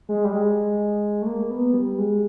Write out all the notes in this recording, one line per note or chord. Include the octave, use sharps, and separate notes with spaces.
G#3
G3
G#3
A3
A#3
B3
G3
G#3